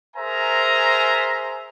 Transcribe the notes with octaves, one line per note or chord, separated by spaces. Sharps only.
G#4 A#4 C5 E5 G#5 A#5